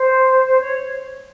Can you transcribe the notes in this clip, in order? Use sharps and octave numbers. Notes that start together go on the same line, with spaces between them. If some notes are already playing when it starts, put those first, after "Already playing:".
Already playing: C5
C5
C#5